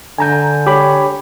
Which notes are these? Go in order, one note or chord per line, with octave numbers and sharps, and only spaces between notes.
D3 G#5 A#5 G6
G4 C#5 B5